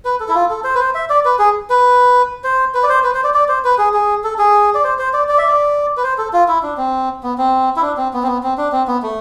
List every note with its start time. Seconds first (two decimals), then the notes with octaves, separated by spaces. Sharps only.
0.05 B4
0.20 A4
0.29 E4
0.35 F4
0.50 A4
0.64 C5
0.75 B4
0.80 C5
0.95 E5
1.10 D5
1.25 B4
1.39 G#4
1.70 B4
2.44 C5
2.74 B4
2.83 D5
2.89 C5
3.04 B4
3.14 C5
3.24 D5
3.34 D5
3.48 C5
3.64 B4
3.78 G#4
3.94 G#4
4.24 A4
4.39 G#4
4.75 D5
4.84 C5
4.99 C5
5.13 D5
5.29 D5
5.38 E5
5.47 D5
5.97 B4
6.03 C5
6.18 A4
6.33 F4
6.48 E4
6.63 D4
6.78 C4
7.23 B3
7.38 C4
7.76 E4
7.82 D4
7.98 C4
8.13 B3
8.23 C4
8.27 B3
8.43 C4
8.58 D4
8.72 C4
8.88 B3
9.03 A3